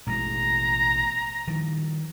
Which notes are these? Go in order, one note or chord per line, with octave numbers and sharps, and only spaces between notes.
A1 B2 G#3 A#5
D#3 F3 G3